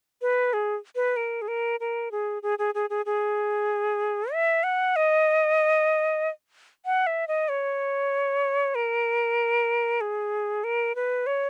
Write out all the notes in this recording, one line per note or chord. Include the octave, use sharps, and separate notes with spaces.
B4
G#4
B4
A#4
G#4
A#4
A#4
G#4
G#4
G#4
G#4
G#4
G#4
E5
F#5
D#5
F#5
E5
D#5
C#5
A#4
G#4
A#4
B4
C#5